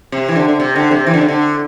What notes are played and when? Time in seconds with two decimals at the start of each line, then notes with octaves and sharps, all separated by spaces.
0.12 C3
0.28 E3
0.36 D3
0.48 D3
0.60 C3
0.76 D3
0.91 C3
1.07 E3
1.14 D3
1.21 C3
1.28 D3